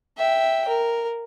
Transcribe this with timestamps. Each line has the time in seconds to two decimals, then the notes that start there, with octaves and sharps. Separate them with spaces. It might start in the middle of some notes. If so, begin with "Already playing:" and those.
0.18 E5 G5
0.68 A#4